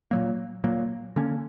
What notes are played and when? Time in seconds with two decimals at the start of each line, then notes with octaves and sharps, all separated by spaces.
0.11 A#2 F#3 A#3
0.64 A#2 F#3 A#3
1.16 D3 A#3 C#4